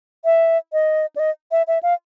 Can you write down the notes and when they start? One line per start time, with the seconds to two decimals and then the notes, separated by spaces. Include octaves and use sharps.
0.25 E5
0.73 D#5
1.16 D5
1.19 D#5
1.51 E5
1.68 E5
1.83 F5